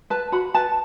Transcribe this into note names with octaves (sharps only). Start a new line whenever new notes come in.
B4 A5
F#4 B5
B4 A5